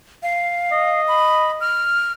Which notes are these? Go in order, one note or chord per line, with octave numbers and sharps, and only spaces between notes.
F5
D#5
B5
F6